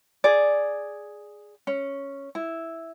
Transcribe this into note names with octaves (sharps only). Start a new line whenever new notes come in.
G#4 D5
C#4
E4